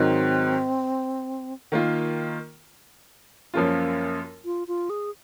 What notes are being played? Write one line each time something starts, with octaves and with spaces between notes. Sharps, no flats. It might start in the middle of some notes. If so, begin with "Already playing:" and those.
Already playing: G#2 D#3 F#3 C4
D#3 A#3 F4
F#2 F3 A#3 C#4 F4
F4
F4
G#4